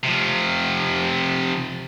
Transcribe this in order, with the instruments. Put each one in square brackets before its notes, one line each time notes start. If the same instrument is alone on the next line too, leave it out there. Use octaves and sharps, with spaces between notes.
[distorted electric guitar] C3 F3